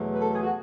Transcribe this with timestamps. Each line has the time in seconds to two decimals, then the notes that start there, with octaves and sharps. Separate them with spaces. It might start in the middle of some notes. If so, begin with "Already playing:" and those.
Already playing: E2 B2 F#3 A3
0.14 B4
0.20 A4
0.34 G#4
0.43 F#4